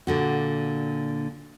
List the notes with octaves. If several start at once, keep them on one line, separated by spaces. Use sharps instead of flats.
A#2 D3 F#4